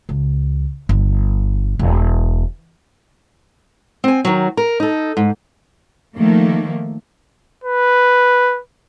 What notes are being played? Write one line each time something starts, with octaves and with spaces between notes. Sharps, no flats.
C#2
G1
E1
C4 G#5
D#3 F#3
A#4
D#4 A4
G#2
D#3 F3 A3 A#3
B4